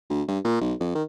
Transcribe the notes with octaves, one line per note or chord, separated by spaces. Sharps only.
D2
G2
A#2
B1
F2
D#3